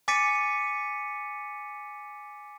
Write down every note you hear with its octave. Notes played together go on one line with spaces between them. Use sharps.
G#5 D6 A6 B6 C#7 D#7